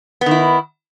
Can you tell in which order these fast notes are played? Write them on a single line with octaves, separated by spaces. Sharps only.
B3 D#3 E4